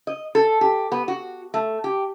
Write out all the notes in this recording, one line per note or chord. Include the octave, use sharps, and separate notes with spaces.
D#5
A4
G4
B3
F#4
A3
G4